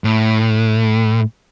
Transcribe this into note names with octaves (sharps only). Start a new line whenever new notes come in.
A2